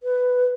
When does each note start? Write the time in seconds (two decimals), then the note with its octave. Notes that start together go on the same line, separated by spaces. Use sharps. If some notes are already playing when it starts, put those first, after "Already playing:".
0.03 B4